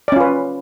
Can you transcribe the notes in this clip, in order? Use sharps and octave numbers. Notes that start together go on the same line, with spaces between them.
C#4 F4 B4 D5